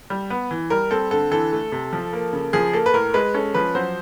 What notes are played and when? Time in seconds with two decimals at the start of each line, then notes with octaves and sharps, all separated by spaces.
0.10 G3
0.30 B3
0.51 E3
0.70 G3 A#4
0.91 C4 A4
1.11 D3 A4
1.31 E3 A4
1.52 A3
1.72 C3
1.93 F3
2.13 A#3
2.33 C#3
2.53 F3 G#4
2.73 A#3 A4
2.86 B4
2.94 A2 A#4
3.14 G#3 B4
3.34 C#4 A4
3.54 F3 B4
3.75 F#3 C5